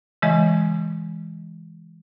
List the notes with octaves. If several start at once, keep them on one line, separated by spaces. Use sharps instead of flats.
C#3 E3 G#3 D#5 G#6